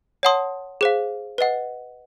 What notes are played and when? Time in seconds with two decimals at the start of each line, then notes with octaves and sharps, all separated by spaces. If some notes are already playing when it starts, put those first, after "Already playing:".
0.23 C#5 F#5 A5 C6 D#6
0.81 G#4 C5 F5
1.38 B4 D#5 F#5